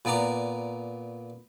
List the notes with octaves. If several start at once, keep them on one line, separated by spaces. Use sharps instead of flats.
A#2 B3 D5 A#5 D6